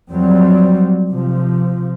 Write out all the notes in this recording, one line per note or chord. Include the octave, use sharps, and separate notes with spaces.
F2 F#3 G3 C4
C3 F3